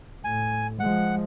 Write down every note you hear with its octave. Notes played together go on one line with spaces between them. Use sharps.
A2 G#5
F3 G#3 F#5